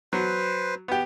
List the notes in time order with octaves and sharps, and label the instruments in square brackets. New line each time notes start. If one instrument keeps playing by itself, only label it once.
[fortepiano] F#3 [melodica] B4 C5
[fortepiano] B3 G4